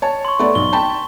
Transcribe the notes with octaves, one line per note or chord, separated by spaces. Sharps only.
C#5 A5
C6 C#6
A3 B3 D5
B1 G7
G5 A5 B5